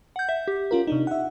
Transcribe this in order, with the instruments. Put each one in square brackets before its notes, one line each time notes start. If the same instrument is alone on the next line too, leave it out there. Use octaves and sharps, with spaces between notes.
[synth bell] F#5 G6
E5
G4
[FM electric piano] C#4 F4 A#4
C3 D4 D#4
E5 F#5